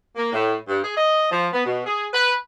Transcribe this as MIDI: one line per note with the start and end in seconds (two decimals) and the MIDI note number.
0.16 0.31 58
0.32 0.54 45
0.68 0.78 43
0.82 0.93 68
0.96 1.29 75
1.31 1.47 53
1.52 1.64 59
1.65 1.83 47
1.86 2.05 68
2.13 2.32 71